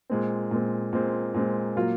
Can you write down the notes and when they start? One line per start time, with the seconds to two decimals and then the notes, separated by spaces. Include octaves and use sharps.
0.10 A#2 G#3 C4
0.51 A#2 G#3 C4
0.93 A#2 G#3 C4
1.34 A#2 G#3 C4
1.76 A#2 F#3 A#3 F4